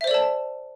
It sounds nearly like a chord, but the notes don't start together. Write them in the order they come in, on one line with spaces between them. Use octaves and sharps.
E5 C5 D5 A4 A5